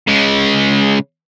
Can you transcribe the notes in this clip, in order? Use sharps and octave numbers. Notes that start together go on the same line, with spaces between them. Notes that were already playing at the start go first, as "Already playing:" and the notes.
C#3 G#3